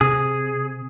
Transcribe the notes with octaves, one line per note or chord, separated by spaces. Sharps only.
C3 G#4